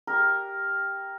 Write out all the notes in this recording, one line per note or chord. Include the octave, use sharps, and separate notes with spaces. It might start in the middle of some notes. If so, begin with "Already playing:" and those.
G4 A#4